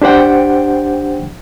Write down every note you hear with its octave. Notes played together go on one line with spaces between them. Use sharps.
D4 G4 C5 F#5 G5